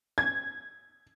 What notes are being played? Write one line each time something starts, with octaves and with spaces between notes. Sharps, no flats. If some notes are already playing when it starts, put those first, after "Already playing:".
G#6